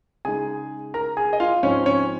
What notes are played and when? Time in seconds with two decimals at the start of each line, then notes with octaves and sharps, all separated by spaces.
0.25 C#3 G#3 D#4 G#4 G#5
0.94 A#4 A#5
1.17 G#4 G#5
1.33 D#5
1.40 F4 F5
1.63 G#2 F3 G#3 C4 C#4 D#4 C#5
1.86 C#4 C#5